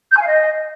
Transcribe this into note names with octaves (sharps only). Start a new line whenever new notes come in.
G6
G#5
F5
D#5